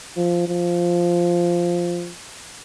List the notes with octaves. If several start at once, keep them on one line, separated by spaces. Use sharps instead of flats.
F3
F3